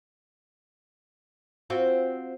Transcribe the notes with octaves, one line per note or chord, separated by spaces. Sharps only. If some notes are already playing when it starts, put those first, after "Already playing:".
C4 F4 F#4